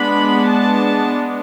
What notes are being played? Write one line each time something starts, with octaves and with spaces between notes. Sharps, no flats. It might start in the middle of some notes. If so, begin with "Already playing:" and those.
Already playing: G#3 B3 D4 B5
A5